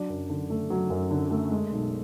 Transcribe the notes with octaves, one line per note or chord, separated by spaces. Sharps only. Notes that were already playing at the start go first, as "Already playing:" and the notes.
Already playing: F#3 D4 D5
F#2
D3
A3
F#3
F#2
D3
A3
G#3
B1